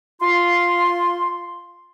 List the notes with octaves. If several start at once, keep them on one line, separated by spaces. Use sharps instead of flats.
F4 C6